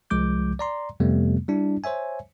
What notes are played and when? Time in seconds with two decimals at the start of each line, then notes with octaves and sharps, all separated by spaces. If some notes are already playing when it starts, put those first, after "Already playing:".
0.10 C2 F3 G#3 D6 G6
0.59 D5 A#5 C6
1.00 F2 C3 G3 A3 B3
1.48 G3 D4 E4
1.84 C5 C#5 E5 G#5